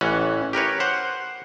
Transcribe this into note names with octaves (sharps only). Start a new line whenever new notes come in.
A1 E3 C#4 F#5
G4 A#4 B4 C#5
C5 F#5